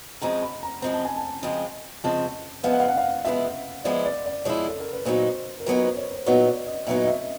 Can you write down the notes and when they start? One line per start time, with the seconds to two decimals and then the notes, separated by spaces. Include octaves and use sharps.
0.22 C#3 F3 G#3 C4 A#5
0.42 B5
0.63 A#5
0.82 C#3 F3 G#3 C4 A#5
0.93 A5
1.05 G#5
1.16 A5
1.43 C#3 F3 G#3 C4
2.04 C#3 F3 G#3 C4 A5
2.63 F3 G#3 B3 E4 F5
2.72 F#5
2.80 F5
2.88 F#5
2.98 F5
3.25 F3 G#3 B3 E4 E5
3.84 F3 G#3 B3 E4 D5
4.05 D5
4.26 D5
4.45 F3 G#3 B3 E4 C#5
4.68 A4
4.80 A#4
4.93 B4
5.05 A#2 F#3 B3 D#4 C5
5.60 A#4
5.66 A#2 F#3 B3 D#4 B4
5.82 C5
5.97 C#5
6.12 C5
6.26 A#2 F#3 B3 D#4 C#5
6.47 D5
6.67 D#5
6.87 A#2 F#3 B3 D#4 E5
7.03 D#5
7.08 E5